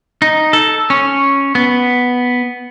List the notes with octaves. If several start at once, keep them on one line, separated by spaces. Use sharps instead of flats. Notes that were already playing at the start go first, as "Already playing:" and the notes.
D#4
A4
C#4
B3